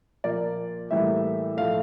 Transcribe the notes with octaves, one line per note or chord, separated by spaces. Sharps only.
A#2 F3 A#3 D5
A2 E3 G3 A#3 E5
A2 F3 A3 F5